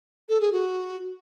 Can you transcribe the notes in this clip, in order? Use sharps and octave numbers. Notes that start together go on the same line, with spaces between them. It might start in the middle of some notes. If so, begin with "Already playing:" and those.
A4
G#4
F#4